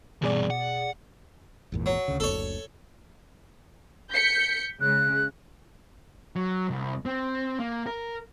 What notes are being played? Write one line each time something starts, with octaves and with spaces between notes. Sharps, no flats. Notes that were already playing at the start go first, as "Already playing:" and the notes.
E2 G2 B2 G#4 D5
F#5
G#1 E2 A#2
F#3
D2 C#3
F#1 D2 D3 A4 C#5
G6 B6 C#7
C#3 G#3 F#6
F#3
C2
C4
A#3
A#4